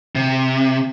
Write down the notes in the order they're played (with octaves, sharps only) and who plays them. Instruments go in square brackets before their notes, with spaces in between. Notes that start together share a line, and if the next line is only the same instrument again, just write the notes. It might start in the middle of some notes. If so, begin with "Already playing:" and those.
[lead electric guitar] C3